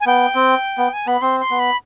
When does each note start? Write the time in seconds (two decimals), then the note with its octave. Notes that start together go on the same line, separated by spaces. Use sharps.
0.01 G#5
0.06 B3 G5
0.35 C4
0.78 B3
0.93 G#5
1.07 B3 B5
1.22 C4 C6
1.40 C6
1.50 B3
1.59 B5